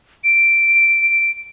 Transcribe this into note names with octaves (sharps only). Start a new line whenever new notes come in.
D7